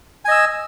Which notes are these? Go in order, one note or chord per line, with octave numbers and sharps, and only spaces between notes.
D#5 G#5 E6